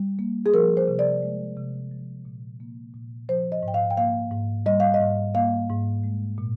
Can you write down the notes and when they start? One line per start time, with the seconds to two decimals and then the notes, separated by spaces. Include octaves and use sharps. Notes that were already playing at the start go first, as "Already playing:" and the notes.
Already playing: G3
0.19 A#3
0.46 G#4
0.54 F3 A#4
0.77 C5
0.88 C3
0.99 D5
1.23 G#3
1.57 C3
1.91 F3
2.25 A#2
2.60 A#3
2.94 A#2
3.29 F3 C5
3.52 D#5
3.63 G#2
3.68 G5
3.74 F5
3.90 G5
3.97 A#3 F5
4.32 G#2
4.66 G3 D#5
4.80 F5
4.94 D#5
5.00 G#2
5.35 A#3 F5
5.69 G#2
6.04 G#3
6.38 A#2